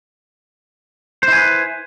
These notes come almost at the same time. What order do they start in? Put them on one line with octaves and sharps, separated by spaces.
C5 E4 G#5 B4